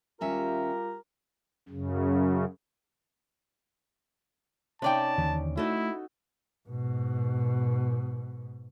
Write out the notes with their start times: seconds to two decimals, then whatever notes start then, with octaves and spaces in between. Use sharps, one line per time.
0.21 D#2 G3 C#4 F4 G4 A#4 E5
1.69 F#2 C#3
4.82 C3 C#4 D#4 D5 G5 A5
5.18 D#2 D3 E3
5.57 A3 D#4 E4 F#4 A4
6.69 G#2 B2